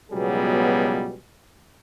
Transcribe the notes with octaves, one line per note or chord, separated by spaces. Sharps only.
C#2 B2 F#3 G3 B3 G#4